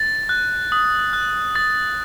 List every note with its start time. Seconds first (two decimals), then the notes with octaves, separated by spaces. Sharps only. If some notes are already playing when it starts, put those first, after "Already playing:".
Already playing: A6
0.29 F#6
0.72 D#6
1.13 F#6
1.55 D#6 A6